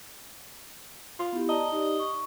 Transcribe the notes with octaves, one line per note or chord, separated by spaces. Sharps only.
F4
B3 E4 G4
D5 D#5 A5 A#5
D#4 G4 D5
C#6